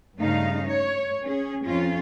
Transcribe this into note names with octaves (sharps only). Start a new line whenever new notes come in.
G2 C#3 A3 D#4 F5
C#5
C#4 G#4
F2 C#4 F4